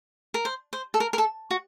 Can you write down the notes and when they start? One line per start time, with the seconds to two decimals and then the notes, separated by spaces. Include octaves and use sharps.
0.34 A#4
0.45 C5
0.73 C5
0.94 A4
1.00 A#4
1.13 A#4
1.18 A4
1.51 F#4